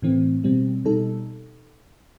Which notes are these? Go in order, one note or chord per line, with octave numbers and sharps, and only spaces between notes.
A2 E3 A3 C4
B2 G3 C4
B2 G3 D#4 A4